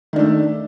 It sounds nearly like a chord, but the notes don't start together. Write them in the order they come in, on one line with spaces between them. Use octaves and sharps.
D#3 D4 A3